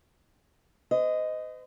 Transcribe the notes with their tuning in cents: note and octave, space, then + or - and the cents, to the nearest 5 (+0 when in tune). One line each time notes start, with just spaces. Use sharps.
C5 -45 D#5 +0